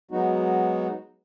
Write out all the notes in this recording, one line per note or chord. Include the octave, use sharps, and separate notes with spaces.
F#3 G#3 B3 D#4 F#4